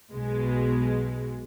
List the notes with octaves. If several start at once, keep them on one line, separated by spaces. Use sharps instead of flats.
B1 B2 G#3